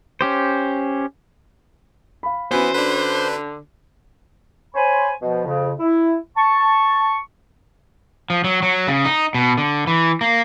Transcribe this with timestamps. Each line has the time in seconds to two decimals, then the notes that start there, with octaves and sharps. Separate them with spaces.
0.21 C#4 G4 C5
2.23 F5 B5
2.51 E3 B3 C#4 F#4 C5
2.74 D3 D4 B4
4.75 C5 C#5 G#5 B5
5.22 B2 F3
5.45 F2 C#3
5.79 E4
6.37 A5 C#6
8.30 F3
8.44 F#3
8.63 F#3
8.87 C#3
9.05 D#4
9.34 B2
9.58 D3
9.87 E3
10.21 A#3